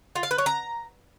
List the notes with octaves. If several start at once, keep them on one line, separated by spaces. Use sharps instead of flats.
F4
F5
B4
C#5
A#5